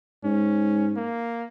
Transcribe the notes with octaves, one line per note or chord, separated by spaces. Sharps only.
G#2 C#4
A#3